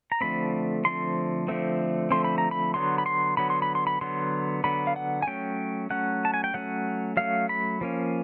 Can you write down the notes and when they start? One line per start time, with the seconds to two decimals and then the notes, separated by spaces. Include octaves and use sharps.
0.12 A#5
0.21 D3 F3 A3 C4 B5
0.84 D3 F3 A3 C4 C6
1.48 D3 F3 A3 C4
2.11 D3 F3 A3 C4 C6
2.24 B5
2.38 A#5
2.51 B5
2.74 D3 F#3 B3 C6
2.98 B5
3.06 C6
3.37 D3 F#3 B3 B5
3.50 C6
3.62 B5
3.75 C6
3.87 B5
4.01 D3 F#3 B3 C6
4.64 D3 F#3 B3 B5
4.87 F5
4.96 F#5
5.22 G#5
5.27 F#3 A3 C#4 G5
5.90 F#3 A3 C#4 F#5
6.25 A5
6.34 G#5
6.44 G5
6.54 F#3 A3 C#4 F#5
7.17 F#3 A3 C#4 F5
7.49 B5
7.81 F3 A#3 C#4